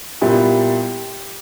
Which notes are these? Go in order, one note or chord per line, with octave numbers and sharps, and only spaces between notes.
A#2 G3 B3 E4 G4